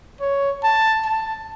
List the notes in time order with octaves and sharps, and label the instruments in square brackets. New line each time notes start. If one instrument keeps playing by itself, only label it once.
[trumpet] C#5
A5
A5